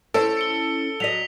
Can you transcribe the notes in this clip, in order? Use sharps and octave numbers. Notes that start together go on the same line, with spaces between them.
C#4 E4 A4 C5 D7
C#7 D7 G7
F#3 D#5 B6 F7